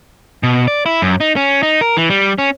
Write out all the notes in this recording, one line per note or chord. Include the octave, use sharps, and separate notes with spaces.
B2
D5
E4
F#2
D#4
C#4
D#4
A#4
E3
G3
C#4